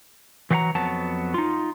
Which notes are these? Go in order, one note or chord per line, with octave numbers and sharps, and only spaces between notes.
E3 F#3 B4 F5 F#5 A#5
F2 F#3 B3 A5
D#4 F4